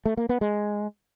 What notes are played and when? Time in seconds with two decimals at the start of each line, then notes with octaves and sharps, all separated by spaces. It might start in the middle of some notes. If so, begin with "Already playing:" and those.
0.06 A3
0.17 A#3
0.29 B3
0.41 G#3